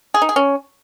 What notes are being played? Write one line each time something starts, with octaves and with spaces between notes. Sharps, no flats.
G#4
D#4
G#4
C#4